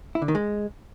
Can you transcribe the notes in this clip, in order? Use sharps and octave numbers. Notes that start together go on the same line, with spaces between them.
E4
D3
D#3
G#3